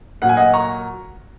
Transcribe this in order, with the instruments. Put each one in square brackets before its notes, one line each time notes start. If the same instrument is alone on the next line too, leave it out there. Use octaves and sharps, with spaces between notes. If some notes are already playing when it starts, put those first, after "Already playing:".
[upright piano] A#2 F#3 F#5
G#5
D#5 F#5
A#5 C#6